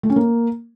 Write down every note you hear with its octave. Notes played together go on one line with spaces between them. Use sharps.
A3
C#4
A#3